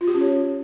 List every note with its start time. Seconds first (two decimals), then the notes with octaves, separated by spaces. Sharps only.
0.01 F4
0.07 G4
0.14 C#4
0.21 C#5